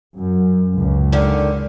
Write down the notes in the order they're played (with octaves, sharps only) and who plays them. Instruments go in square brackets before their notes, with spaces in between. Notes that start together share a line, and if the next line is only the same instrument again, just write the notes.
[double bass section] F#2
C#2
[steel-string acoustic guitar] D3 D#3